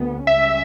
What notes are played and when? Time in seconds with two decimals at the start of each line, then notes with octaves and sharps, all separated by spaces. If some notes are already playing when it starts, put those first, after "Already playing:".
Already playing: D2 B3
0.27 C#2 C#3 G3 C#4 E5